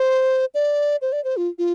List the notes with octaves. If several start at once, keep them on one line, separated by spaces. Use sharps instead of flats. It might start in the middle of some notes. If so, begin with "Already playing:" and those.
Already playing: C5
D5
C5
D5
C5
F4
F4